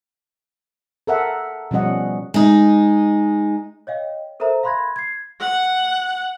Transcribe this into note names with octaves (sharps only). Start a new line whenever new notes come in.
A4 A#4 E5 F#5
B2 F3 G3 C#4 D#5 F#5
G#3 D#4
C#5 D#5 F5 G5
A4 A#4 C5 E5 A#5
F5 B5 C6 F#6 G#6 A#6
G#6 C7
F#5